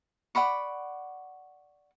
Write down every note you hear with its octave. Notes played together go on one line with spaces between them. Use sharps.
D5 F#5 B5 C#6